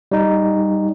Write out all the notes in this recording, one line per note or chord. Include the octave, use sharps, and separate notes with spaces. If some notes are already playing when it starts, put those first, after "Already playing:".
G3 D#4